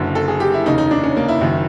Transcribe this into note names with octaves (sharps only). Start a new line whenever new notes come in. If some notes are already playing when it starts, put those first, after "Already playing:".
Already playing: F#1 F#2 D3
A4
G#4
G4
E4
F1 D#2 C#3 D#4
D#4
D4
C#4
A#3
E4
F#1 F#2 D#3